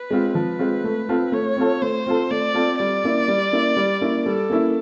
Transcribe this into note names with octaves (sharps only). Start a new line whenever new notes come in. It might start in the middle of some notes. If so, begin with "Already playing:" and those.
Already playing: B4
G#3 C4 F4
F3 B4
G#3 C4 F4
A3
C4 F4 A4
A3 C#5
C4 F4 A4
A3 C5
C4 F4 A4
A3 D5
C4 F4 A4
G3 D5
A#3 C#4 E4
G3
A#3 C#4 E4
G3
A#3 C#4 E4
G3 A4
A#3 C#4 E4